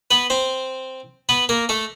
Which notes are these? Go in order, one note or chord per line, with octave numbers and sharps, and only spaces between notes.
B3 B4
C4 C5
B3 B4
A#3 A#4
A3 A4